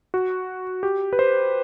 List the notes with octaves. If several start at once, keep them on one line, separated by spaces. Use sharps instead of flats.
F#4
G4
B4
C5